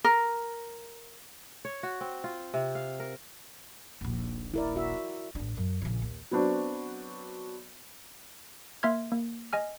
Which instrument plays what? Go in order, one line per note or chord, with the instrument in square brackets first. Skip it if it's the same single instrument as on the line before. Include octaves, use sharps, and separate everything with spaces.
[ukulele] A#4
[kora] C#5
F#4
C4
F4
C3
F5
A#4
[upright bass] D#1 A#1
[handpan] E4 A#4 D5
F#4 E5
[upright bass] A1 D4
F#2
A#1 C#3
D#2
[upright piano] F#3 B3 C4 D4 F#4
[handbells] A#3 E5 C6 F6 G#6
A#3
D#5 G#5 F6